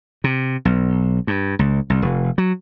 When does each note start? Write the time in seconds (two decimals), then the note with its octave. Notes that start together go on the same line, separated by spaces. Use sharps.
0.24 C3
0.65 B1
1.27 G2
1.59 C#2
1.90 C2
2.02 F1
2.38 F#3